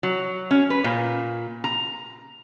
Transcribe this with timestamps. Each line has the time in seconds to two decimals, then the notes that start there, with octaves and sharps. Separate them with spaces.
0.03 F#3
0.51 C#4
0.70 B4
0.84 A#2
1.64 A#5